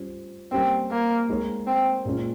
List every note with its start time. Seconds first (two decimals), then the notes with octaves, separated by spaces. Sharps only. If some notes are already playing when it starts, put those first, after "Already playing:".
Already playing: G3 C#4 F4 C5
0.52 G3 A#3 C4 C#4 G4 A#4
0.91 A#3
1.29 G#3 D#4 A#4 C#5
1.67 C4
2.05 A#2 G#3 C#4 F4